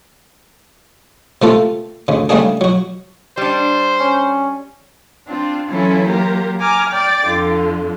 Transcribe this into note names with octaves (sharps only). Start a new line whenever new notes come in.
C3 A3 A#3 F4 A4
D2 C#3
C#3 G3 A3 A#3 D4 G#4
F#3 F#4
G3 D4 C5
C#4
C4 D4 F4
E3 F#3 C#4 E4 F4 A4
F#3 A#3 F4 G4 A#4
G#5 A#5 D6 F6
D5 G5 D6 A6
F2 D3 F4